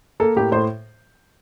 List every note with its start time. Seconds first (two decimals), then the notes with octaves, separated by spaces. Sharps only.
0.20 A#3 A4
0.36 A2 G4
0.52 A2 C5